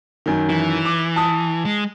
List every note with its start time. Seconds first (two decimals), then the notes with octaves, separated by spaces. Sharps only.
0.26 F#2 D#3
0.49 E3
0.85 D6
1.16 A5 D#6
1.65 G#3